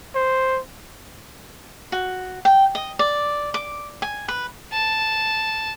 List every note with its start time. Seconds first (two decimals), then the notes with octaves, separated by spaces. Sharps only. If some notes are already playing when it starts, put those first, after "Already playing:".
0.15 C5
1.92 F#4
2.45 G5
2.75 D#5
2.99 D5
3.54 D6
4.02 G#5
4.28 B4
4.72 A5